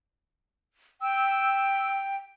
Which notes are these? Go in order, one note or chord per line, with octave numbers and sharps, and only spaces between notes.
G5 E6